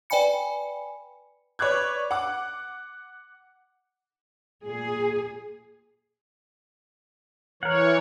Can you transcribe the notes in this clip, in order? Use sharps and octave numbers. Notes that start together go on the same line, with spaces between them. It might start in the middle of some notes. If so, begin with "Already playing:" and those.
B4 D5 G5 G#5 B5 C#7
B4 C#5 D5 D6 F#6 G#6
F#5 D6
A#2 G#4
E3 A#4 C#5 F#5